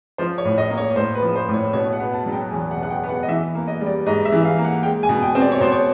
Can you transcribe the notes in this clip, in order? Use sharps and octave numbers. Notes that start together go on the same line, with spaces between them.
F3 C5
C#5
A2
D#5
A#3
C#5
A2 C5
B4
F3
C5
A2
C#5
B2 C#5
F#5
B3
A5
F#3
G5
E2 G#5
F#5
B2
F#5
G5
B3
F#5
D#5
E3 E5
A#3
D#5
G3
D5
G#2 D#5
E5
E3
E5
F5
A#3
F#5
G#3 G5
G#5
B2
G5
C4
D5
C#5
B2 C5
C#5